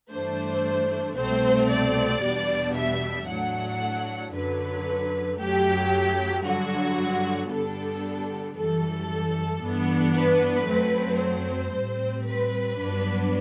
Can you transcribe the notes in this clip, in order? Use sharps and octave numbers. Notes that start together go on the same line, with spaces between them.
G2 E3 A3 D4 C5
C2 B2 A3 C4 C5
D5
E2 B2 G3 B3 D4
E5
A2 F#3 A3 D4 F#5
F#2 D3 F#3 B4
F#2 F#3 A3 G4
G2 D3 F#3 F#4
G2 D3 G3 B3 D4 A4
F#2 E3 G3 A4
G2 E3 B3 D4
B4
F#2 F#3 A3 C4
C5
A2 G3 C4
B4
G2 F#3 B3 D4